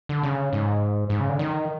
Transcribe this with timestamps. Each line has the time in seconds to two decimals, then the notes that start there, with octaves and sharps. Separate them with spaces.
0.09 D3
0.23 C#3
0.53 G#2
1.10 G#2
1.20 C#3
1.29 D3
1.39 D#3